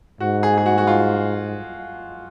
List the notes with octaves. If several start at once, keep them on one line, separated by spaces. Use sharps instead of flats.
G#2 F#4
G#4
G#4
F#4
F#4
F4